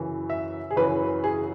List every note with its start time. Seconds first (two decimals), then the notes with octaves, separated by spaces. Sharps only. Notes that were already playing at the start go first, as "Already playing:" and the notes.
Already playing: F#2 C#3 E3
0.30 E5
0.71 G#4
0.76 F#2 C#3 E3 B4
1.24 G#4